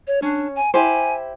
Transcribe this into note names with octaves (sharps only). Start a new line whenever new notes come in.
C#5
C#4 D4
G#5
E4 G4 C5 G#5